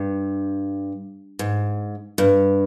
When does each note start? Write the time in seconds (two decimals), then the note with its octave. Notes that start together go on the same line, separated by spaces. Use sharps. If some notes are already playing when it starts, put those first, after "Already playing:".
Already playing: G2
1.39 G#2
2.18 G2